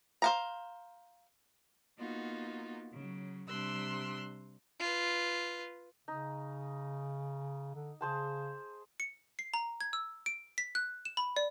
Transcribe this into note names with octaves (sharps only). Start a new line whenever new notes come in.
C5 F5 A#5
A#3 B3 D#4 F4 F#4
C#3 F#3
C3 G3 D4 C6 E6 F#6
F4 B4
C#3 D#4
D3
C#3 G#4 C5 A5
C#7
C7
A#5
G#6
E6
D7
B6
F#6
E7
B5
D5